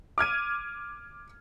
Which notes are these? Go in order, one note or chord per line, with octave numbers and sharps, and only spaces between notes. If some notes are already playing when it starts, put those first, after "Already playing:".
D6 F6 G#6 D#7